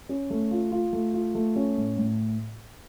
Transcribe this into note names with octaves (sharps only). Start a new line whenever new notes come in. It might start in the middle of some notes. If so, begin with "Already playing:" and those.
C#4
A3
F4
F4
A3
F4
A3
C#4
A2
A2